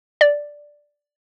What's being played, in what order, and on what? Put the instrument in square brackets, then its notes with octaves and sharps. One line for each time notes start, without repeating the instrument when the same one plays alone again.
[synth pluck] D5